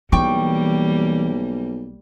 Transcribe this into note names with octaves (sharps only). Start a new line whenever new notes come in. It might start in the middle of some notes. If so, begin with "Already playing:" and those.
B1 E3 G3 A#3 G5 C#6 D6